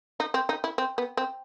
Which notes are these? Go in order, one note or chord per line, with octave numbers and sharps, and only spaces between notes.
D#4
C4
D#4
E4
C4
B3
C4